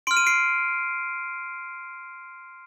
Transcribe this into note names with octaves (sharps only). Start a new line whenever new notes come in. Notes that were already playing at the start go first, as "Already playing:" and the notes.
C6 F6 D7
D#7
C7 D7